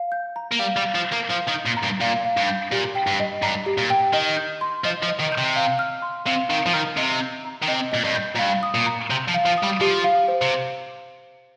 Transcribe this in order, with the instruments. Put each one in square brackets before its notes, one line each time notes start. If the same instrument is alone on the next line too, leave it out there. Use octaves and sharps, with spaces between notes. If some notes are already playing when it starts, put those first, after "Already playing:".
Already playing: [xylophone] F5
G6
A#5
[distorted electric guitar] A#3
[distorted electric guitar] G3 [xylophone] F5
[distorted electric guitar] G3
[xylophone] F5
[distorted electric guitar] F3
[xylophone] G6
[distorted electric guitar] A#3
[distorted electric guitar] F3 [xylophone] F5
[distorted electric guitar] D#3
[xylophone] G6
[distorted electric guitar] A#2
[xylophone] A#5
[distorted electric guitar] G2
[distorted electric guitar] A#2 [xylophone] F5
[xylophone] F5
[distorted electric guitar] G2
[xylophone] G6
[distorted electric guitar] A#2 [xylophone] G4
[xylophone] G5
[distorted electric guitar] G2
[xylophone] D#5
[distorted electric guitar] G2 [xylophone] A#5
[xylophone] G4
[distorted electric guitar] A#2
[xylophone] G5
[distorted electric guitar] D#3 [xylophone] D#5
[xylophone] G6
C6
[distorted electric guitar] F3 [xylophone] D#5
[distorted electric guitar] F3
[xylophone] D#5
[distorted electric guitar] D#3
[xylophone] G6
[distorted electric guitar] C3
[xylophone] F5
F6
C6
[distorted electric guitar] C3 [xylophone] F5
[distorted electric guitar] D#3 [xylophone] F5
[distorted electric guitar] F3
[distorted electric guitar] D#3 [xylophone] F6
[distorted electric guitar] C3 [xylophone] D#5
[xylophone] G6
A#5
[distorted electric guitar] D#3
[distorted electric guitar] C3 [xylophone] D#5
[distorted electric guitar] A#2 [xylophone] D#5
[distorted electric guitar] G2
[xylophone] G6
[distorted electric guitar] A#2
[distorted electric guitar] G2 [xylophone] F5
[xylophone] D#6
[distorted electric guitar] A#2
[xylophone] A#5
[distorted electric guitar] C3 [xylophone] G6
[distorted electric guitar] F3
[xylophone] F5
[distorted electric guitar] F3
[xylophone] D#6
[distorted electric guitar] G3
[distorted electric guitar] F3 [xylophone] G4
[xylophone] F5
C5
[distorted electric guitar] C3